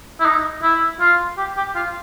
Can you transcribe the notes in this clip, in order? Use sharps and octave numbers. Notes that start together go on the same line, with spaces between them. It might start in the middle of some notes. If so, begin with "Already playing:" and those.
E4
D#4
E4
F4
G4
G4
F4